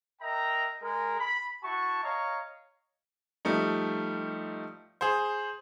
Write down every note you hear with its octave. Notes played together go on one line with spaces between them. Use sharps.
A#4 D#5 E5 G5 A#5
G#3 G#4 A#4
B5
E4 F#4 A5 C#6
C#5 D#5 F5 A#5 C#6
F3 G3 A3 D#4
G#4 C5